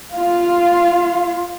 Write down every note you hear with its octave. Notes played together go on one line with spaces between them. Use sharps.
F4 F5